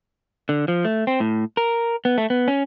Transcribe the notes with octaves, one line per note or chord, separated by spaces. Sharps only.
D3
F3
A3
C4
A2
A#4
B3
A3
B3
C#4